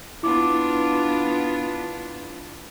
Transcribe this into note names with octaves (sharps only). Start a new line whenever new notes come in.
B3 D4 E4 F4 D6